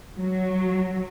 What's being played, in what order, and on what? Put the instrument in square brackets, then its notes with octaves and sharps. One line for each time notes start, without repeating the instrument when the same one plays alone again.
[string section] F#3